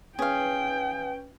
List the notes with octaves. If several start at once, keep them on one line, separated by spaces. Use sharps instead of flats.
C#4 G#4 B4 F5 G5